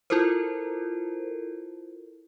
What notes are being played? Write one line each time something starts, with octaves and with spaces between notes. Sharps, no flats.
E4 F4 A4 A#4 C5